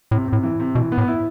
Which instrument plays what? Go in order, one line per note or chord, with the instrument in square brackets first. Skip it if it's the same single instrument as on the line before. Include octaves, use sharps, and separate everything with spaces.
[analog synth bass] A2 [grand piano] C3
[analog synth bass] A2 [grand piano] C3
[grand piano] E3
C3
[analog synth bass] B2 [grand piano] E3
[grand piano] B3
[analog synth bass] A2
[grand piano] E4